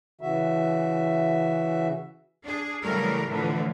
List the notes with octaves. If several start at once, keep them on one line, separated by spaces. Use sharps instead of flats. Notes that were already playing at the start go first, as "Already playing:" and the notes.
C#3 E3 F#4 E5
D4 G#4
C#3 E3 F#3 G3 A3 A#4
A2 D3 E3 F3